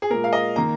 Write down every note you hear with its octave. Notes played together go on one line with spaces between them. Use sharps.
G#4
A#2 G#3 A#4
F5
D#5
D#3 A#3 A#5